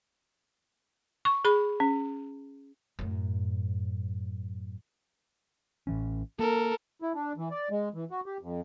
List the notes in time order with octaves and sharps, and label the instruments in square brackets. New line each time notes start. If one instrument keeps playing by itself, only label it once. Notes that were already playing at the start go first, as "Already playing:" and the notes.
[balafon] C#6
G#4 B5
C#4
[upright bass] F#2 A2
[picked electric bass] A1 E3 C#4
[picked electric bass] A#3 [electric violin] A4 A#4
[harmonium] E4
D4
E3
D5
G#3
E3
F#4
G4
F2